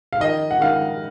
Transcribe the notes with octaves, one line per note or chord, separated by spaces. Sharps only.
F5
D#3 D#5
F#5
D#3 F5